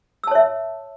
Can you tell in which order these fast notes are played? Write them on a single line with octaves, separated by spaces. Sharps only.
E6 A5 C#5 E5